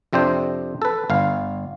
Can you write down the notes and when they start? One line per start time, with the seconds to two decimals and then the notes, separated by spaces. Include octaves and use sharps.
0.13 F2 C3 C4 D4 C5
0.82 A4 B4
1.10 G1 F5